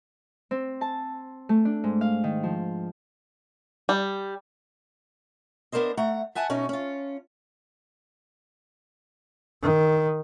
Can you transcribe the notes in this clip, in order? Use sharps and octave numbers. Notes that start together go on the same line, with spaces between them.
C4
A5
A3
D4
G#2
F5
D#3
F3
G3
B3 D4 A#4 C5 D#5
A3 F#5 A#5
E5 F#5 G#5 A5
B2 C#4 D#4
C#4 F4
D#3